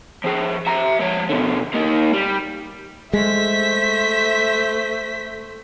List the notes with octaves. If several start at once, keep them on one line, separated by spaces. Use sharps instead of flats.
F3 G#4
E5 A#5
F3 C#5
B2 D3
A#3 D#4
G3
G#3 A3 C5 E5 B6